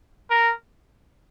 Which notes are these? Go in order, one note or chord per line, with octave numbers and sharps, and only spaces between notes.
A#4